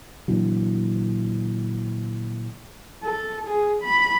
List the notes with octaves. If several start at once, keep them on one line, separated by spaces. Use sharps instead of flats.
A#2 D3 E3 F#3
A4
G#4
B5